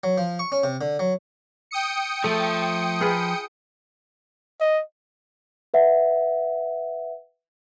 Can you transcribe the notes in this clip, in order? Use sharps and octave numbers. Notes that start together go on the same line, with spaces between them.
F#3
F3
C#6
C#4
C3
D3
F#3
G5 D#6 C#7
F3 A3
F4 G#4 B4
D#5
B4 E5 F#5